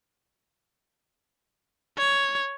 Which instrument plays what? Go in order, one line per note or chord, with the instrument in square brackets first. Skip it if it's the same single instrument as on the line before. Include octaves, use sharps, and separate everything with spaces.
[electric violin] C#5